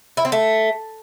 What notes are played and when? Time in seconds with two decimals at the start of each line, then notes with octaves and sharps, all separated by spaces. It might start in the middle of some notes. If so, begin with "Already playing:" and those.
0.17 E4
0.25 C4
0.32 A3